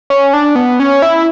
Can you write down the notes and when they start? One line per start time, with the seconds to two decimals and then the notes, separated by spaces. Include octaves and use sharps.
0.10 C#4
0.33 D4
0.55 B3
0.80 C#4
1.02 E4